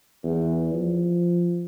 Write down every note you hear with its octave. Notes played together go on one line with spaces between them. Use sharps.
E2
F3